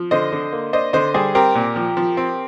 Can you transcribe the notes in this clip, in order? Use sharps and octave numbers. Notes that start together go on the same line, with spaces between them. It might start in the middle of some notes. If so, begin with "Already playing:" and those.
Already playing: F3
D3 C5 D#5
D3
A#3
D4 C5 D#5
D3 C5 D#5
G3 G#4 C5
C4 G4 A#4
A#2
F3
F3
C4